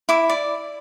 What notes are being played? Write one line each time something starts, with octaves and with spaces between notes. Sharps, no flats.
E4 D6
D5